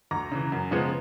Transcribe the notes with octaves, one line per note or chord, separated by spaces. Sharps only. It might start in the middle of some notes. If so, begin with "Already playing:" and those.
D2 A#5
C#3 E3
F#2
C#3 F3 G#3 B3